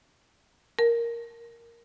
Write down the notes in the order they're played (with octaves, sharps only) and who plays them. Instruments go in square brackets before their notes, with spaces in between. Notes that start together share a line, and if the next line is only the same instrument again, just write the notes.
[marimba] A#4